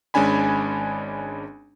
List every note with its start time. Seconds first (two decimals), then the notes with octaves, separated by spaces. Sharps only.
0.14 G#1 G#3 C#4 D4 G#5 B5